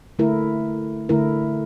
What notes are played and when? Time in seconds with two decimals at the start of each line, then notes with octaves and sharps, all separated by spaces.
0.19 D3 A3 E4 A#4
1.09 D3 A3 E4 A#4